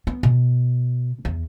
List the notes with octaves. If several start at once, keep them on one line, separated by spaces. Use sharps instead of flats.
B3
B2
E2